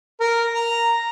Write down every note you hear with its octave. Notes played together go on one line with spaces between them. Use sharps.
A#4
A#5